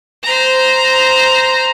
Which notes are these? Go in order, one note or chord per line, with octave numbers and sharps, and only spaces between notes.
C5 A#5